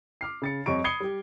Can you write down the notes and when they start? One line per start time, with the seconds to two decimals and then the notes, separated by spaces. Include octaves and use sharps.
0.21 D6 F6 C7
0.42 C#3 A6 C#7
0.66 F2 G3 C#5 D#5 C#6 D7
0.84 B5 D#6 G#6 C7 C#7 G7
1.00 G3 G4